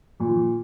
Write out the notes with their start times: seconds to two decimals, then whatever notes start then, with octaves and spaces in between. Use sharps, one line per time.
0.20 A#2 F3
0.27 D#3
0.35 F3